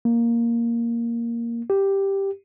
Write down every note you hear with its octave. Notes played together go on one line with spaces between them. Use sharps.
A#3
G4